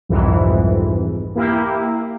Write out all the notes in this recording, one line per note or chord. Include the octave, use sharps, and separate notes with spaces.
C2 F2 G#2 E3
A#3 E4 G4